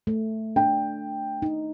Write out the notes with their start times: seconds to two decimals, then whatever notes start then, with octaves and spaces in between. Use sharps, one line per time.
0.07 A3
0.56 D4 G5
1.42 D#4